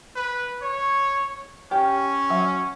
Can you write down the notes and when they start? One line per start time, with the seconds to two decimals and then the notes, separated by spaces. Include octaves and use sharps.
0.16 B4
0.62 C#5
1.71 C#4 G4
2.30 F#3 E5